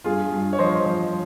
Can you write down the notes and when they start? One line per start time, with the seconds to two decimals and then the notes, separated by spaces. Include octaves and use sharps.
0.04 G2 F4 G#4
0.32 G2
0.53 C#5
0.59 F3 C5 D#5
0.86 F3